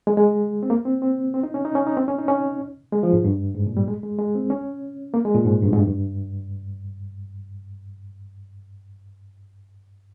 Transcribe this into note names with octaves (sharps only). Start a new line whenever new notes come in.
G#3
G#3
C4
A#3
C4
C4
C4
D#4
C#4
D#4
C#4
D#4
C4
C#4
D#4
C#4
G#3
F3
G#2
G2
G#2
A#2
G3
G#3
G#3
G#3
C4
C#4
A#3
G#3
A#2
G#2
G2
G#2
G2
G2